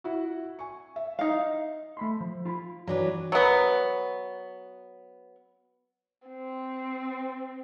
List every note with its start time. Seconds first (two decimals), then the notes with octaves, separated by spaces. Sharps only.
0.04 E4 F#4
0.59 G#5 C#6
0.96 E5
1.19 D#4 F5
1.97 A3 B5 C6
2.20 F3
2.45 F4 B5
2.87 G2 E3 F#3 D4 B4 A#5
3.32 F#3 B3
6.28 C4